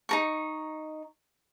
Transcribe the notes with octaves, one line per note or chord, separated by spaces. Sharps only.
D#4 A#4 C#6